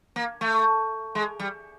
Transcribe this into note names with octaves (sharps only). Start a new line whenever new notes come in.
A#3
A3
G#3
G3